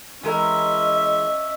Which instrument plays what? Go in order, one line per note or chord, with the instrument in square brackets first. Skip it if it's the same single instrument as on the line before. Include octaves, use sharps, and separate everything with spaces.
[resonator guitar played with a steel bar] E3 G#3 A#4 [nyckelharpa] C#4 E5 [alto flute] D#5